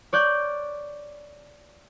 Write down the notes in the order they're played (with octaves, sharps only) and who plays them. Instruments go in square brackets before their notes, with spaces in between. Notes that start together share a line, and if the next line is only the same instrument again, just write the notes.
[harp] C#5 D5 F#6 G6